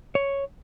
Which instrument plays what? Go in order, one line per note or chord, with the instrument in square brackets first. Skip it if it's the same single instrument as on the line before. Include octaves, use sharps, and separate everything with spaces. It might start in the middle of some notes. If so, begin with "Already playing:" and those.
[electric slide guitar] C#5